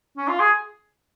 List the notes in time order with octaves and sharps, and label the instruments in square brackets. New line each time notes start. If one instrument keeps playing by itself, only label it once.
[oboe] C#4
F4
G#4